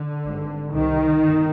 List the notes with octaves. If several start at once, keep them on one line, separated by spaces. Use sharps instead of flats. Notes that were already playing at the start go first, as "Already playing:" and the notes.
Already playing: D3
G#1 G2
C2 C3 D#3
G1